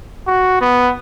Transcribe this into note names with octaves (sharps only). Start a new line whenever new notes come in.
F#4
B3